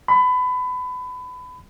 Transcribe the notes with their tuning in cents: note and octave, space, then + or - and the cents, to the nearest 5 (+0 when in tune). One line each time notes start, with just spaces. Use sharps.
B5 +25